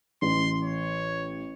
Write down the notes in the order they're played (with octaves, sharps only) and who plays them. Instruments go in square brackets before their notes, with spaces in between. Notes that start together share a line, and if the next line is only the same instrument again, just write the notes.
[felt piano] A1 [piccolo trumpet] C6
[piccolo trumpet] C#5